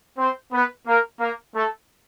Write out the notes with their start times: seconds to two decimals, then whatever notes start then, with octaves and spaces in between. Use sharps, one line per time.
0.18 C4 C5
0.52 B3 B4
0.87 A#3 A#4
1.20 A#3 A#4
1.55 A3 A4